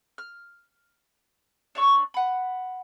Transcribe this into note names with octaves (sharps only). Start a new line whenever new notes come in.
F6
D4 C#5 C#6 E6
F#5 B5